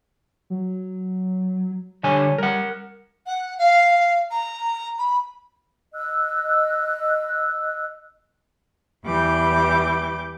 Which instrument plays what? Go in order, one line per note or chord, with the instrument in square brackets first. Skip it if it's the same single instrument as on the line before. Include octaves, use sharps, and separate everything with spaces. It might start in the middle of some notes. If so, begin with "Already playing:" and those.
[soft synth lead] F#3
[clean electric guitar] D3 G3 G#5 [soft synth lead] C#5
[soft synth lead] G3 [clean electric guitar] A#4 F#5
[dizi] F#5
F5
A#5
B5
[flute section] D#5 E6 F#6
[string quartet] E2 E3 G3 D6 G6